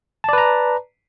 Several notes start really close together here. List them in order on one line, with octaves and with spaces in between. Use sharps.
A5 D5 B4 A#5